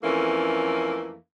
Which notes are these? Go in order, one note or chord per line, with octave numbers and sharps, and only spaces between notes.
F2 E3 A3 A#3 C#4